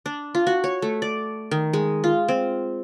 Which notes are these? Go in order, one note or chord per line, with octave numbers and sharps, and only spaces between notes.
D4
F4
F#4
C#5
A3
D5
D#3
G#3
F4
C4